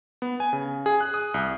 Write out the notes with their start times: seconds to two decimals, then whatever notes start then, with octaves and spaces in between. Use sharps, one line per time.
0.22 B3
0.40 G#5
0.53 C#3
0.86 G#4
1.01 F#6
1.14 D#6
1.34 C2